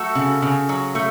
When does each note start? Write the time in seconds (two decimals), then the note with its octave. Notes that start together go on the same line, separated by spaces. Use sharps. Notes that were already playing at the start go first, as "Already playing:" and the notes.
Already playing: F#3 A3 F#4 A4
0.15 C#3
0.42 C#3
0.69 F#3
0.95 A3